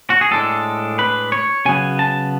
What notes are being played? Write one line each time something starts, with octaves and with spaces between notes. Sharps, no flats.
F#4
G#4
A2 G#3 D4 A4
B4
C#5
C#3 F#3 B3 G#5
A5